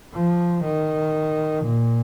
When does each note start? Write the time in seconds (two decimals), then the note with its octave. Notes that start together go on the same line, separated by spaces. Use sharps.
0.14 F3
0.64 D#3
1.65 A#2